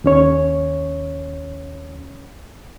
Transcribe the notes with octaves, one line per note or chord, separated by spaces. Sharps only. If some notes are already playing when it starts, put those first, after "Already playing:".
D#2 C#4 C#5